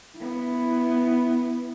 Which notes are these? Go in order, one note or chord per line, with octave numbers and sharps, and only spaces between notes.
B3 E4